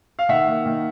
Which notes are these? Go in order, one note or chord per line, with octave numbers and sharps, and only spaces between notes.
F5
D#3 E5 F#5
A#3
D#3